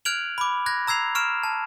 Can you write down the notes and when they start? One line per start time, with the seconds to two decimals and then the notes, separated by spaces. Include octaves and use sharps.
0.05 F6 F#6 G#6 D7 F7 F#7
0.38 B5 D6
0.66 F#6 G#6 A#6
0.87 A#5 E6 G#6 C7 F7
1.15 C#6 F6 D7 E7
1.44 A5